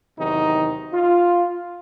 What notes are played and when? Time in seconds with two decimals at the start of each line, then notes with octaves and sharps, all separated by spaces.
0.18 E2 C3 D#3 F#3 D#4
0.93 F4